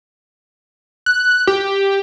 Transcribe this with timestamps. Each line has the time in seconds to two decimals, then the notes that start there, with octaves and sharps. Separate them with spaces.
1.06 F#6
1.47 G4